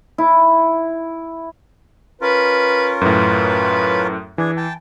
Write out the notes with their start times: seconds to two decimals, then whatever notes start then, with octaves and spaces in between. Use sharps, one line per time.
0.18 E4
2.21 C#4 F4 A#4 B4
3.01 F#2 A2 B4
4.38 E3 D4 G#4
4.57 G5 A5